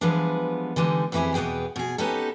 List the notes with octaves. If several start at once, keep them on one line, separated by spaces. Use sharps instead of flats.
E3 F3 G3 G#3 B3 D4
D3 E3 G3 G#3 D#4
F2 E3 D#4 E4 G4 G#4
E2 B2 B3 G#4 G5
B2 G#4
B3 C#4 D#4 G4 A4